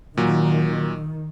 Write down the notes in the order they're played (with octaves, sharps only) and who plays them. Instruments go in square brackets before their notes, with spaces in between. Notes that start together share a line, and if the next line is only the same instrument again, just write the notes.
[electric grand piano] A#2 F#3 [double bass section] D#3